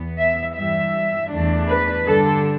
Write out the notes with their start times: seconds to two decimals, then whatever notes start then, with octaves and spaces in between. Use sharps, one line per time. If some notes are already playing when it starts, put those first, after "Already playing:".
Already playing: E2 E3 B3
0.18 E5
0.55 G2 E3 G3 E5
1.31 E2 E3 A3 D4
1.68 B4
2.05 G2 D3 G3 D4 A4